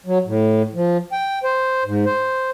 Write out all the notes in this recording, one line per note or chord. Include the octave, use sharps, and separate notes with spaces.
F#3
A2
F3
G5
C5
G#2
C5